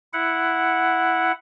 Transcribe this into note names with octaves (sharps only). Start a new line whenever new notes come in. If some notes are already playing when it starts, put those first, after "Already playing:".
E4 F#5